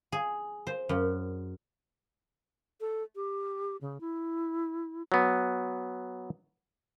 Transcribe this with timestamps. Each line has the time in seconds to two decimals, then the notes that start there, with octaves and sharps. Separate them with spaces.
0.12 G#4
0.67 C5
0.89 F#2
2.81 A4
3.15 G4
3.81 C#3
4.00 E4
5.12 F#3 B3